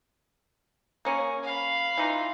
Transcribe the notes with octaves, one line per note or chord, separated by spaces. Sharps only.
A#3 C#4 G#4
F5 B5
E3 D#4 F4